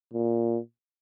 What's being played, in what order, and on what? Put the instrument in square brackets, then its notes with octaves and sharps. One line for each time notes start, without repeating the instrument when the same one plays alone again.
[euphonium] A#2